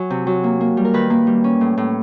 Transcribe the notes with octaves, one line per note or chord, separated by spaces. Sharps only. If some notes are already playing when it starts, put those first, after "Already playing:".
Already playing: F#3 G#5
C3
F#3
A#3
A#3
G3
A#4
D#3 B4
A#3
G3
C#4
A2
A2